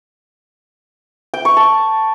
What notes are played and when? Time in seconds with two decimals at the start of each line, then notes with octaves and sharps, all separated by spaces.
1.34 G5
1.45 C#6
1.57 A5